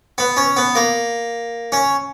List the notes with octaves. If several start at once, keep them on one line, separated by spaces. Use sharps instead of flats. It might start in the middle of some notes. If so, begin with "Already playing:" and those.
B3
C#4
B3
A#3
C#4